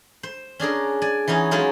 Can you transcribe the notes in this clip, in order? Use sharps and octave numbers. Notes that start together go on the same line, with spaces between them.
C5
C#4 D4 G#4 A#4
D5 G#5
E3 B3 C#4 D#4
F#3 G#3 C#4 D#4 F4 G#4